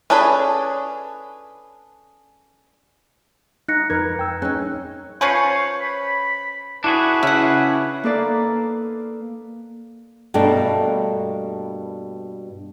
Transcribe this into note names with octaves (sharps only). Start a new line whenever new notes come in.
C#4 D4 G#4 A4 B4
D#4 F#6 A#6 C#7
F2 A#4 B4 G#6
G5 E6
C#4 D#4 G#4 F#6
F3 C#4 B4 C#5 G6 C7
B5
D4 E4 F#4 G#4 B4
C#3 C#4 E4 E5 F#5
A#3 D#4 A4 B4 D5 F5
G2 B2 A3 A#3 D4